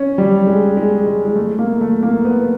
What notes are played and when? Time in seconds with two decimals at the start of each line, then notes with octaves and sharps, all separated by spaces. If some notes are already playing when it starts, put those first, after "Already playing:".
Already playing: C#4
0.18 G3
0.47 G#3
0.77 G#3
1.06 G#3
1.25 G#3
1.36 A3
1.59 A#3
1.81 A3
2.03 A#3
2.25 B3